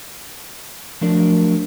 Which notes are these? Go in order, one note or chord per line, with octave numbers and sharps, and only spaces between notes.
F3 F#3 A3 D4 A#4 D5